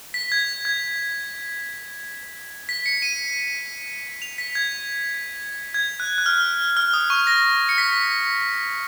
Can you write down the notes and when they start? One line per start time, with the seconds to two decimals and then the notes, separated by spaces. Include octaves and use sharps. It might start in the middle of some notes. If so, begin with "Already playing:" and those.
0.14 B6
0.32 G#6
0.65 G#6
2.69 B6
2.86 C#7
3.02 D#7
4.22 F7
4.38 B6
4.55 G#6
5.74 G#6
6.00 F#6
6.18 F#6
6.26 F6
6.77 F6
6.93 D#6
7.10 C#6
7.27 A#6
7.69 C#7
7.78 B6